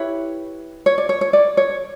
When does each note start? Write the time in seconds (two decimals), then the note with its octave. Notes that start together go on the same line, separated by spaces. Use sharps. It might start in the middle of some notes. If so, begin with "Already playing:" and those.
Already playing: E4 G4 B4 C#5
0.86 C#5
0.98 D5
1.09 C#5
1.21 C#5
1.33 D5
1.57 C#5